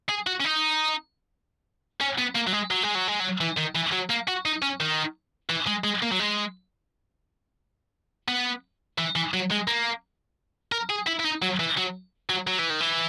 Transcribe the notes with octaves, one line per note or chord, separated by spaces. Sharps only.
G#4
F#4
C#4
D#4
C#4
B3
A#3
F#3
G#3
F#3
G#3
F#3
G#3
F#3
E3
D#3
E3
F#3
A#3
F#4
D#4
C#4
D#3
E3
G#3
G#3
A#3
F#3
G#3
B3
E3
E3
F#3
G#3
A#3
A#4
G#4
E4
E4
D#4
F#3
E3
F#3
F#3
F#3
E3
D#3
E3